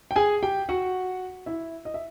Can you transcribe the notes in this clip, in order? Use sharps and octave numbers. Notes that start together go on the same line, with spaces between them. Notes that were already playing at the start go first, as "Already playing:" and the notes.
G5
G#4 G#5
G4 G5
F#4 F#5
E4 E5
D#5
E5